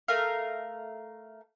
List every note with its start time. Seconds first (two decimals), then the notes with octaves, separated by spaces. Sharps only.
0.08 A3 A#4 F5